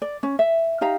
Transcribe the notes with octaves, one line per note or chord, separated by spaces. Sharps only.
D5
C#4
E5
D#4 G4 F5 A#5